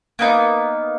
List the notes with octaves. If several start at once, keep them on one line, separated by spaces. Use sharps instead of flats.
A#3 B3 D#4